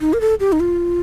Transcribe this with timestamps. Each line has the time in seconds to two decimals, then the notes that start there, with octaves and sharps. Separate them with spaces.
0.01 D#4
0.13 A#4
0.21 A4
0.40 G4
0.52 D#4
0.60 F4